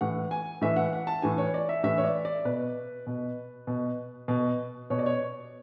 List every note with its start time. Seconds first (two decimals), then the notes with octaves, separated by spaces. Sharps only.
0.01 A2 E3 F#5
0.31 G#5
0.61 A2 E3 E5
0.76 F#5
0.93 F#5
1.07 A5
1.22 A2 E3 G#5
1.38 C#5
1.54 D5
1.69 E5
1.83 A2 E3 E5
1.98 C#5
2.04 D5
2.25 D5
2.45 B2 B4
3.07 B2
3.67 B2
4.28 B2
4.90 B2 C#5
4.99 D5
5.06 C#5